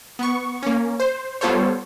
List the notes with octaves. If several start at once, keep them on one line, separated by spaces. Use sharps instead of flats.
B3 C#6
A#3 C#4
C5
G3 B3 F4 A4 C5 C#5